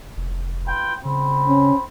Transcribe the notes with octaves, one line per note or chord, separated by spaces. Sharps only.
F1
F4 B4 G5
C#3 C4 B5
C#4